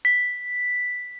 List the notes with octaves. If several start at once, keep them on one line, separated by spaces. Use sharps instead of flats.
B6